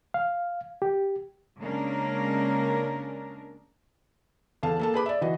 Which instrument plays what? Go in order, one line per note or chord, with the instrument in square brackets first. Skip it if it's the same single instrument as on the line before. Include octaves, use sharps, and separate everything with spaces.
[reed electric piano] F5
G4
[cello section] C#3 G#3 A#3 C#4 D4 A#4
[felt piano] E2 A4 F5 A5
A#3 A4 A5
G#4 B4 B5 D6
D5 E5
E3 F#4 D#5